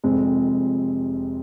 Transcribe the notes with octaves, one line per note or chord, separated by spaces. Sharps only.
F1 F2 C3 G#3 C4